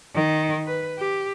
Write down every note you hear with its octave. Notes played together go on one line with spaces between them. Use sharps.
D#3
B4
G4